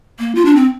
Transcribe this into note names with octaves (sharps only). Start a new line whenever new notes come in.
A#3
F4
D4
C4